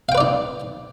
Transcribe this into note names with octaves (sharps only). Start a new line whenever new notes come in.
D#4 B4 D5 F5 G5